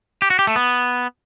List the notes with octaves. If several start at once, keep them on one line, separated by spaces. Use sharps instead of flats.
G4
F#4
G4
A3
B3